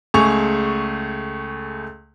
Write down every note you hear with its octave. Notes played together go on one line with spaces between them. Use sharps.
C#2 A3 G#4 C#6 F7